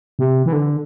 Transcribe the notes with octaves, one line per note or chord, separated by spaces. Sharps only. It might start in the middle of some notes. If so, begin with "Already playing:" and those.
C3
E3
D3